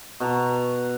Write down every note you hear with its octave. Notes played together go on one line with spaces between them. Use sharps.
B2 A5 A#5